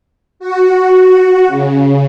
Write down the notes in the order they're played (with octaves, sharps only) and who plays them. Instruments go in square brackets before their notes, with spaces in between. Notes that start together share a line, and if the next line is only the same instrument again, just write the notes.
[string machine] F#4
C#3